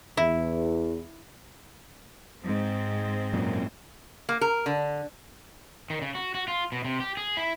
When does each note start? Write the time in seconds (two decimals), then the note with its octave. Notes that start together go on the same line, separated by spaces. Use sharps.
0.17 E2 E4
2.46 G#2 C4
3.33 F#2 A#2
4.29 A#3
4.41 A#4
4.66 D3
5.90 D#3
6.02 C#3
6.15 F#4
6.35 F#4
6.48 F4
6.72 B2
6.84 C3
7.00 G4
7.17 G#4
7.37 E4